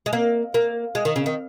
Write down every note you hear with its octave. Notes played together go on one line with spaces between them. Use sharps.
G#3
A#3
A#3
G#3
D#3
C#3
D#3